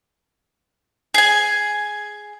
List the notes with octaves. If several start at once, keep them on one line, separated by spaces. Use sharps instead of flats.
G#4 G#5